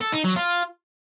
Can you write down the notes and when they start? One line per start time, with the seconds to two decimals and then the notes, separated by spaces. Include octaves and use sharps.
0.01 A4
0.12 D#4
0.24 F#3
0.36 F4